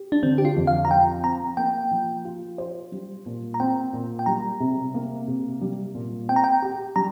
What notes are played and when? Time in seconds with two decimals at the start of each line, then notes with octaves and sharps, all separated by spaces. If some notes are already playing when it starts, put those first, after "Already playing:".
Already playing: G4
0.12 D4
0.23 D3 C4
0.38 G4
0.45 F4
0.56 F2
0.67 F5
0.85 A#5
0.90 F3 G5
1.24 C4 A#5
1.57 A#3 G5
1.91 F3
2.25 F4
2.58 C5
2.92 G3
3.26 A#2
3.54 A#5
3.60 C4 G5
3.93 A#2
4.19 G5
4.26 G3 A#5
4.60 C3
4.94 A#3
5.28 C3
5.61 G3
5.95 A#2
6.29 C4 G5
6.36 A#5
6.44 G5
6.62 G4
6.96 G3 A#5